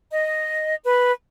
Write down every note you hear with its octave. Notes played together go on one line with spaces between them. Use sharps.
D#5
B4